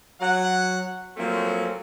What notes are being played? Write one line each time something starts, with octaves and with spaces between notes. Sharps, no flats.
F#3 F#5
F3 F#3 A3 A#3 C4 C#4